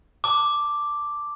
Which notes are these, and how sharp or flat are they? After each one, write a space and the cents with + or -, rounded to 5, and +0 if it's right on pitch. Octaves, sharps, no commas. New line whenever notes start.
A5 +20 D6 +0